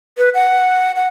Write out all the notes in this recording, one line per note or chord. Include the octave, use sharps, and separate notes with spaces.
B4
F#5
F#5